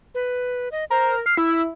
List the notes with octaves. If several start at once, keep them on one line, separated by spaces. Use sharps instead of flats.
B4
D#5
A#4 C5
F6 C7
E4 E6